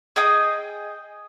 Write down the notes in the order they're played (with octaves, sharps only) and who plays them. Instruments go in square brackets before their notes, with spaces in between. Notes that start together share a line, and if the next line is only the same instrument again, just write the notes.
[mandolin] G#4 D#5 G5 D#6